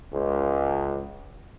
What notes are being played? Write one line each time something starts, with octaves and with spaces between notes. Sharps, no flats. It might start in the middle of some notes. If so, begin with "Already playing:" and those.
C#2